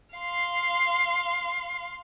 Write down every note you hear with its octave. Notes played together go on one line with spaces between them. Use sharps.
F5 C6